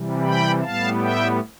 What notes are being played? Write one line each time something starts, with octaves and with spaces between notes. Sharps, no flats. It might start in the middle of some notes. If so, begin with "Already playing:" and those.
Already playing: C3 E3 G3
G5 B5
A2 G3 B3 F5 A5
E5 G5